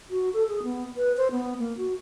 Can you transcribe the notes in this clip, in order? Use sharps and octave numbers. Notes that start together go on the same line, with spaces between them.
F#4
A4
G#4
B3
B4
C5
B3
A#3
F#4